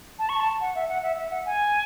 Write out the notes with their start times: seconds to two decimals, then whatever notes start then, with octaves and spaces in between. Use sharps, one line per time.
0.19 A5
0.29 C#6
0.40 A5
0.61 F#5
0.75 E5
0.89 F#5
1.03 E5
1.17 E5
1.31 F#5
1.46 G#5